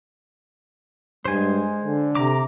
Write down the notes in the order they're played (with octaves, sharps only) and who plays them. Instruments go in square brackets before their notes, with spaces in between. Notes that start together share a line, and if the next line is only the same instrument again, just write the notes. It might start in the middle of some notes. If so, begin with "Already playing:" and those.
[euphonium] G2 [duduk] G#3 [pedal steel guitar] C5 G#5
[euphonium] D3
[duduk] C3 [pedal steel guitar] A#5 D6